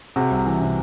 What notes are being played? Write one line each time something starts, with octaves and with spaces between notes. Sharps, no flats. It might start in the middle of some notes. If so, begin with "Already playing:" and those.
C3 F#4 G#4
C2
E3
C3